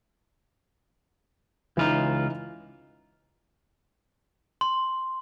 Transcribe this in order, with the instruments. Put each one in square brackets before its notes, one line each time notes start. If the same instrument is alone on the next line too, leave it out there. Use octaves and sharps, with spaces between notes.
[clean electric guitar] C#2 F4 [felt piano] E3 D#4
[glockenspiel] C6